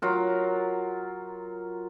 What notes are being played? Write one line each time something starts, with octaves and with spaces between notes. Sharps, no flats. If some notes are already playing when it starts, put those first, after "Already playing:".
F#3 F4 A#4